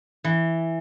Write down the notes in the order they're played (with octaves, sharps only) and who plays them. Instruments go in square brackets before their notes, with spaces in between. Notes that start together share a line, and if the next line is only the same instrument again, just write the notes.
[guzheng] E3